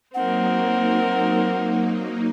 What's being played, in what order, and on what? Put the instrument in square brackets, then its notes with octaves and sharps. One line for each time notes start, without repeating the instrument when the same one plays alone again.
[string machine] F#3 A#3 D#4 [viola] C4 A#4 [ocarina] F#5